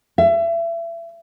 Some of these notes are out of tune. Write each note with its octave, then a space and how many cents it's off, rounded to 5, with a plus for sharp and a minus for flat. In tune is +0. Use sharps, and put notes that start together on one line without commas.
E5 +30